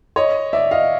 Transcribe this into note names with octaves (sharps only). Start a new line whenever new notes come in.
C#5 D#5
D5 E5
D#5 F5